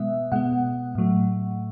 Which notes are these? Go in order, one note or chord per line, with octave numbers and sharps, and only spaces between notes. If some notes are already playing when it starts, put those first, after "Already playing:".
Already playing: B2 G#3 B3 E5
B2 G#3 B3 F#5
A2 F#3 A3